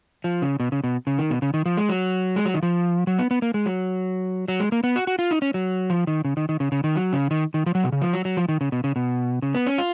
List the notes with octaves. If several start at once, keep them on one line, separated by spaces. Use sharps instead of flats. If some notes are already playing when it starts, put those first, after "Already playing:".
F3
C#3
B2
C#3
B2
C#3
D#3
B2
C#3
D#3
F3
G#3
F#3
G#3
F#3
D#3
F3
F#3
B3
B3
A#3
G#3
F#3
F#3
G#3
A#3
B3
F#4
F#4
F4
D#4
C#4
F#3
F3
D#3
C#3
D#3
D#3
C#3
C#3
D#3
F#3
C#3
D#3
D#3
F3
F#3
B2
C#3
F3
F#3
F#3
F3
D#3
C#3
B2
C#3
B2
C#3
B3
C#4
F4